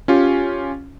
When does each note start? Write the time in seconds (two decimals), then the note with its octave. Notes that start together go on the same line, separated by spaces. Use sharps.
0.08 C#4 F4 G4